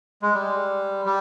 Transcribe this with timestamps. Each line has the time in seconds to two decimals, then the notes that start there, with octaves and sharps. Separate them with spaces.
0.22 G#3
0.34 G3
1.05 G3